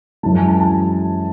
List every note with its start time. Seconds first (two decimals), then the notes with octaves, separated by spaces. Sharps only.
0.23 F#2 E3 G#3 A5
0.36 G#5
0.48 A5
0.60 A5